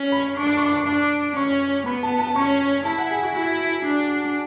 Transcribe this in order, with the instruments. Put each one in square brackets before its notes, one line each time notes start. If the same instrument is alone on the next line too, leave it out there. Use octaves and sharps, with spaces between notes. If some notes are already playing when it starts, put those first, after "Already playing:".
Already playing: [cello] C#4
[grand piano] B5
[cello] D4 [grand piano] C#6
[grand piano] D6
C#6
D6
C#6
[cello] D4 [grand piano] D6
[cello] C#4 [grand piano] C#6
[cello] B3 [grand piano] B5
[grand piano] A5
A5
[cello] C#4 [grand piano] C#6
[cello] E4 [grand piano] A5
[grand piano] F#5
G#4
F#4
[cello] E4 [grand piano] F#4
[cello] D4